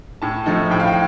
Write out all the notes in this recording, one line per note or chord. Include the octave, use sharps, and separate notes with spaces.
A2 A5
F3 A3 D#4
A2 G5
F5
G5